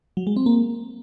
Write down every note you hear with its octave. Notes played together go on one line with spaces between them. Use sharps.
F#3
G#3
C4
A#3